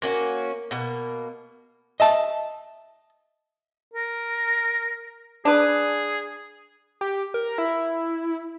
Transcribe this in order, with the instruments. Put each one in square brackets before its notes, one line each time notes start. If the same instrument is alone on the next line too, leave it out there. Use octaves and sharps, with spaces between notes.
[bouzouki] A#3 C#4 F#4 [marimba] A#4
[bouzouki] B2 A#3
[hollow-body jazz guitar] D#5 E5 A5
[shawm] A#4
[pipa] D4 B4 [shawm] G#4
[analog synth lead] G4
A#4
E4